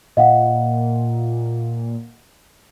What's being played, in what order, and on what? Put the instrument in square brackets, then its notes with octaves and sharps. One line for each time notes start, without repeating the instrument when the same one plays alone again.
[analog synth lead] A#2 [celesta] D#5 F5 F#5